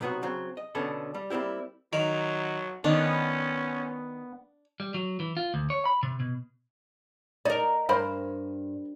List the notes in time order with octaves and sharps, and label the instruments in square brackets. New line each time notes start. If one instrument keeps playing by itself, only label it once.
[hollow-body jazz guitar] B1 C3 B3 D#4 F#4
C#3 F#3 C4
D#5
B2 D3 B3 C#4 D4 A4
G3
G3 A#3 C4 E4 G4
[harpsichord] D#3 A#4 [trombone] F#3
[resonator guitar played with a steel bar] D#3 [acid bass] B3 [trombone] C#4 [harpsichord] D4
[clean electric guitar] G3
F#3
E3
F4
D2
C#5
B5
C3
B2
[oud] D#4 A#4 [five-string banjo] D5
[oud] G2 [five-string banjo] A#4 C5 B5